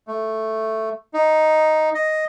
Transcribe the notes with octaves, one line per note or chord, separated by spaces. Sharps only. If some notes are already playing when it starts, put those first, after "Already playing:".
A3
D#4
D#5